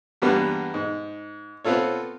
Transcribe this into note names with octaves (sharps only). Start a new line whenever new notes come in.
E2 G2 G3 A#3 B3
G#2
B3 C4 F4 A4 C#5